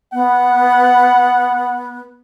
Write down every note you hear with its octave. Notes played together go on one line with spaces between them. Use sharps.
B3 F#5